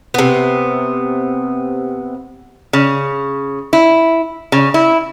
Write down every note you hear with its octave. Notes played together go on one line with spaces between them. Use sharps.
C3 B3
C#3
E4
C#3
E4